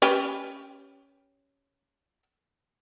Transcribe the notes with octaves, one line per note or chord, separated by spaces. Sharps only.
C#4 G4 B4